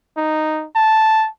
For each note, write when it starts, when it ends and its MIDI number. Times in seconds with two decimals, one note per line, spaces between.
0.17 0.66 63
0.76 1.28 81